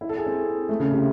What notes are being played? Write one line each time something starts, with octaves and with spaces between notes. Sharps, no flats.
E4
A4
G#4
C4
A3
C#3
C3